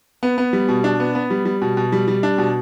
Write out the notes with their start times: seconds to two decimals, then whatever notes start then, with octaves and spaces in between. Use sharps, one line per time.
0.23 B3
0.38 B3
0.53 G3
0.69 B2
0.84 D4
1.00 B3
1.15 B3
1.30 G3
1.45 G3
1.62 B2
1.77 B2
1.92 G3
2.08 G3
2.23 D4
2.38 B2